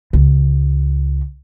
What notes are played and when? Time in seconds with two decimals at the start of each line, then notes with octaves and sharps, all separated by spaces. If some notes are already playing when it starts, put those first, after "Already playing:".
0.13 C#2